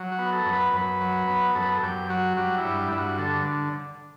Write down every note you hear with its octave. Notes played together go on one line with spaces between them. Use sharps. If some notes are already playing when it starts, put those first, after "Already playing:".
Already playing: F#3
F#4
B3
A4
F#2
B4
F#2 B4
F#3
B3
F#2 A4
B4
A4
F#2 G4
F#3 F#4
G3 F#4
E4
G2
G2 E4
F#4
D3 A4